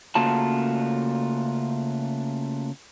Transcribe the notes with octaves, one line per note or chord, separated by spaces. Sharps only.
C#3 A3 A#3 F4 F#4 A5